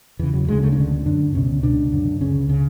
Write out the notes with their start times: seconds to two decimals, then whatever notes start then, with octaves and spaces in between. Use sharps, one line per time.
0.19 E2 C#3 E3
0.33 F#3
0.48 D2 C#3 G#3
0.63 A3
0.72 D4
0.77 D2 D3 C#4
1.06 F#2 D3 D4
1.35 C#2 B2 C#4
1.63 C#2 B2 D4
1.92 F#2 D3
2.21 C#2 C#3 C#4
2.49 C#3